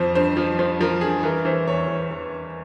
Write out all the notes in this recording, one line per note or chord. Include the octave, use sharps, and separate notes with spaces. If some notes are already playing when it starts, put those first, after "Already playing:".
Already playing: F2 F3 C5
G2 C5
F3
F3 C5
F3 A#4
G2 G#4
E3 A#4
E3 C5
E2 C#5
E3
E3